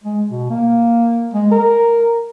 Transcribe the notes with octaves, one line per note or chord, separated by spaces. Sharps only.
G#3
B2
A#3
G#3
A#4